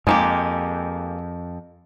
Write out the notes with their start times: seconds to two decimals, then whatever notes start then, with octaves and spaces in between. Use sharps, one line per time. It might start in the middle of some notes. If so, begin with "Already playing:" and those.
0.07 F2 G#3 A#3 G4